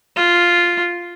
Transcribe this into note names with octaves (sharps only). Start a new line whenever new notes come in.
F4